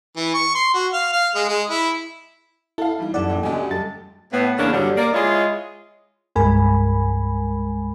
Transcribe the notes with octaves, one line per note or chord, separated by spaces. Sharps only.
E3
C#6
C6
F#4
F5
F5
G#3
G#3
E4
E4 A4 F5
E3 G3 D#4
F#2 E4 A4 D5 F#5
A#1
D2 A3 C#4 G4 D#5 G#5
G3 G#3 A4 A6
A2 B3
E2 C#3 A#3 D4
G2 D3 F#3 G3
A#3 D5
G#3 E4 F4 C#5 D#5
C2 G2 G#3 A#4 G#5 B5